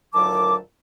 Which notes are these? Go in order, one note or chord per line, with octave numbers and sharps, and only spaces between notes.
D2 A#2 D#3 F#3 A5 D6